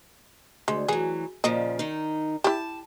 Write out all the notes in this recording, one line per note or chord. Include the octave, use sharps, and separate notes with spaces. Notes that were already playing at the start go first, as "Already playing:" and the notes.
D2 G#3
E3 F#3 G#4
A#2 C#3 F3 D#5
D#3 D#4
E4 G4 A5